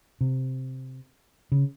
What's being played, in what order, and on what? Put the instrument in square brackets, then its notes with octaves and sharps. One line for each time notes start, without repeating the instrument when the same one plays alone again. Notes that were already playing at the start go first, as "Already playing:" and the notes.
[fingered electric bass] C3
C#3